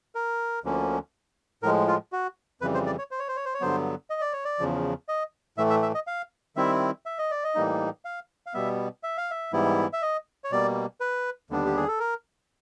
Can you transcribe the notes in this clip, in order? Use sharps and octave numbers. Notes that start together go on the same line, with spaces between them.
A#4
D2 D3 F3 A#3 C#4
A2 F3 G#3 A#4
F4
F#4
F2 C#3 E3 G3 B4
C5
D5
C#5
C5
C#5
C5
C#5
C5
C#5
G2 D3 F#3 B3 C5
D#5
D5
C#5
D5
E2 C#3 F3
D#5
A2 E3 A3 E5
E5
E5
D#5
F5
D#3 G3 C4 E4 E5
E5
D#5
D5
D#5
A2 E3 G3 A#3 D#4
F5
F5
B2 G3 B3 E5
E5
F5
E5
G#2 E3 G3 B3 E4
E5
D#5
C#5
B2 G3 A#3 D5
B4
D#2 D3 G3 B3 D4
G4
G#4
A4
A#4